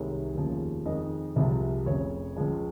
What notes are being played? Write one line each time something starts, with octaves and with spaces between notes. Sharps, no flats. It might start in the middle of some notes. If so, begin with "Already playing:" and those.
Already playing: C2 C3 D#3 G#3 C#5
F1 D#2 C#3 F3
F2 D#3 G#3 D#5
C2 C3 F3 G#3
F1 F2 C#3 C#5
C#2 C#3 F3 G#3